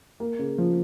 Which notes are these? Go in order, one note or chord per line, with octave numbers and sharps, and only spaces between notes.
A#3
C#3
F3